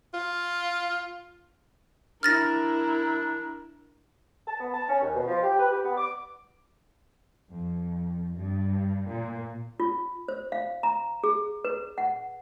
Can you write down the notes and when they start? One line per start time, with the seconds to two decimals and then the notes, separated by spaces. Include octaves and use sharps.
0.14 F4
2.23 D4 E4 A#4 F6 A6 A#6
4.48 A5
4.61 B3
4.74 A5
4.89 C#4
5.02 D#2
5.14 B2
5.28 F3
5.43 G4
5.59 B4
5.71 G4
5.85 B3
5.98 D6
7.50 F2
8.36 G2
9.08 A#2
9.80 F4
10.28 C5
10.52 F5
10.83 A#5
11.24 G#4
11.65 B4
11.98 F#5